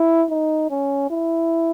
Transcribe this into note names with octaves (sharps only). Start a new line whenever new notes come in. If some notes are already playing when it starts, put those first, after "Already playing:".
Already playing: E4
D#4
C#4
E4